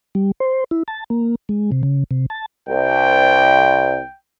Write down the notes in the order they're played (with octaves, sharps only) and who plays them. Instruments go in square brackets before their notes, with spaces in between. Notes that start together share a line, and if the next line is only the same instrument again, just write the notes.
[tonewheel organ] G3
C5
E4
A5
A#3
G#3
C3
C#3
C3
A5
[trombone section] C2 [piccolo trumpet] G5